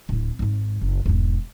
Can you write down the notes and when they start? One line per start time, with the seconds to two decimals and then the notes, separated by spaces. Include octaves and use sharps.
0.09 D1 E4
0.39 G#1 G#2
0.81 F#1
1.06 E1 G#2